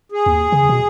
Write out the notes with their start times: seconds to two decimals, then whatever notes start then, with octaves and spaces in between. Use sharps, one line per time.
0.12 G#4
0.26 D#2
0.52 C#3
0.69 B2